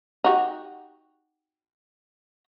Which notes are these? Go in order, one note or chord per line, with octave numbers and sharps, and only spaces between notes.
D#4 F#4 G4